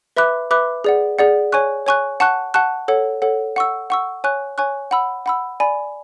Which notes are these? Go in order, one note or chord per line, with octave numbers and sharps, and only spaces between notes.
B4 E5 B5 D6 F#6
B4 E5 B5 D6 F#6
G#4 D5 F#5
G#4 D5 F#5
C#5 G#5 C#6 F#6
C#5 G#5 C#6 F#6
F#5 A5 C#6 F#6
F#5 A5 C#6 F#6
A4 C#5 F#5
A4 C#5 F#5
F#5 C#6 E6
F#5 C#6 E6
C#5 G#5 C#6 F#6
C#5 G#5 C#6 F#6
F#5 B5 E6
F#5 B5 E6
D5 G#5 B5